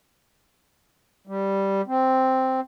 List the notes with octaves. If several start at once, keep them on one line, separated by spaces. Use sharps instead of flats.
G3
C4